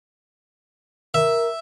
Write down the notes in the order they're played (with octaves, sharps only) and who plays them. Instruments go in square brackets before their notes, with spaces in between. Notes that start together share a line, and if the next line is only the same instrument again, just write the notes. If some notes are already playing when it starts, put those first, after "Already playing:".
[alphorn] A#4 [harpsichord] E5